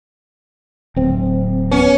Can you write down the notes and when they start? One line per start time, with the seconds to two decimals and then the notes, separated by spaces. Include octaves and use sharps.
0.96 D1 C4
1.71 B3 C#4